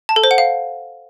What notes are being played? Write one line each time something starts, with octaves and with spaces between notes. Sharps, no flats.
A5
A4
C5
F#5
F5